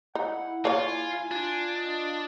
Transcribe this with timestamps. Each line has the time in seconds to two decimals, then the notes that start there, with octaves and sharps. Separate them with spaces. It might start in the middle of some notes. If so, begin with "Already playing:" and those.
0.15 D#4 E4 F#5
0.65 A#3 F4 C#5 G#5
1.31 D4 F4
1.76 D#5